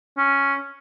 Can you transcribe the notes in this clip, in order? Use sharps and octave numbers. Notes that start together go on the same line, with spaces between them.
C#4